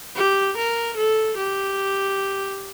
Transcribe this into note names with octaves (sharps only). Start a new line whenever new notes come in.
G4
A#4
A4
G4